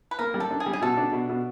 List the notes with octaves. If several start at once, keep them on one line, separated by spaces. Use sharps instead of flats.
B4
A#3 A#4
G3
A4
D4
G#4
G3
G#4
B2 A4
D4
B2
B2